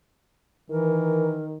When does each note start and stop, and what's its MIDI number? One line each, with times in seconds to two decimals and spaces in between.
0.70 1.58 51
0.70 1.39 52
0.70 1.45 70